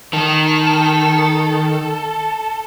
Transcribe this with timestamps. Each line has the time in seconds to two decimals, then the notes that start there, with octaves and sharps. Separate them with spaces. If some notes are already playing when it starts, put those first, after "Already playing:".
0.13 D#3 A4